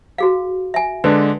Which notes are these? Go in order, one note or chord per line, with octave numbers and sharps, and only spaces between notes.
F#4 G#4 F5
E5 G#5
D3 G#3 D4 B4